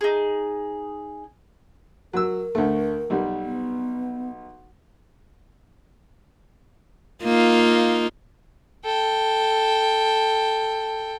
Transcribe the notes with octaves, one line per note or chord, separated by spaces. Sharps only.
D#4 G#4
F#3 A#4 E6
D2 A3
B1 G3
B3
A#3 D#4 F4
A4 G5